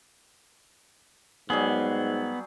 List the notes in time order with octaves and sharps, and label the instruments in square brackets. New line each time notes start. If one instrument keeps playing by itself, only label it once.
[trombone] G#2 [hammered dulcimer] F#3 G3 G#4 [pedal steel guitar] B3